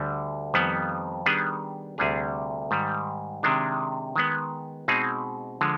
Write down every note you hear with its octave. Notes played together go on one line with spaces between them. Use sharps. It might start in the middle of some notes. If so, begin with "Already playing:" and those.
Already playing: D2 D3 G3
F2 D#3 G3 B3
D#3 G3 B3 D4 G#4
D2 C3 G3 D4 G#4
G#2 D#3 G3
C3 D#3 G#3 D4
D#3 G#3 B3
B2 G#3 C4 D#4 G#4
D3 F3 G#3